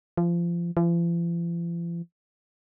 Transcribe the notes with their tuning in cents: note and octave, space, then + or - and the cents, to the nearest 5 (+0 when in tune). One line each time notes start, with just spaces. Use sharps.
F3 -25
F3 -45